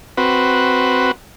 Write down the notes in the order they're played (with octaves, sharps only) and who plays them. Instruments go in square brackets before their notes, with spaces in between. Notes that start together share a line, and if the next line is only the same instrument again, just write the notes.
[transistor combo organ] C4 F#4 B4